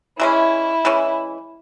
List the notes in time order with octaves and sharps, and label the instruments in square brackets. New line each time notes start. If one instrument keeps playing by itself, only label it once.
[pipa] E3 G#3 C#4 [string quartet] E4
[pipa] E3 G#3 C#4